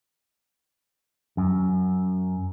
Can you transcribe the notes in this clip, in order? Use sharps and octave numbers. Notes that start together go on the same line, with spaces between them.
F#2